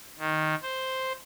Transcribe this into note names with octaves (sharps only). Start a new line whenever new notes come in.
D#3
C5